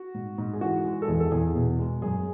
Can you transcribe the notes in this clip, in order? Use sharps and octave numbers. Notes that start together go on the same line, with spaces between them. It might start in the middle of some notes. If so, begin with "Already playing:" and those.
Already playing: F#4
G#2
G#2
G#4
E3 F#4
G#3
A4
E2 G#4
A4
E2 G#4
B2
G#3
F#2 G#4